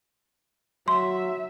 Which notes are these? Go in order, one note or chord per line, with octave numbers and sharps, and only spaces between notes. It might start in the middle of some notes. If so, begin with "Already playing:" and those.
F#3 E5 C6